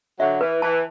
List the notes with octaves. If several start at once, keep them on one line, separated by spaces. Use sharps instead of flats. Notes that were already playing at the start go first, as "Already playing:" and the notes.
D3 F#3 E5
E3 B4
E3 A5